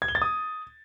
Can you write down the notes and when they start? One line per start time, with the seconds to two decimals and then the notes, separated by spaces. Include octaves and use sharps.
0.02 G#6
0.08 G7
0.15 A6
0.22 D#6